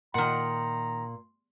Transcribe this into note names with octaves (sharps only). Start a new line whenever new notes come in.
A#2 D#3 F#5 A#5 C6